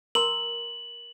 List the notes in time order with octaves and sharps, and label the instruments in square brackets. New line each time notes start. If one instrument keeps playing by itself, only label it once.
[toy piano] A#4 A#5 C6 [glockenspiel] F#7